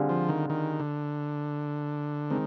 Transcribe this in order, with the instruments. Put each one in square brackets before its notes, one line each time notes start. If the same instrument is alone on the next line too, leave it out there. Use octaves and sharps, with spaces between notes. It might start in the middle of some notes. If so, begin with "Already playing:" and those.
Already playing: [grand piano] D3 G3 C4 F4 G#4
[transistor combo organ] F3
D#3
D#3
D3
[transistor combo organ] D#3 [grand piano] G#3 C4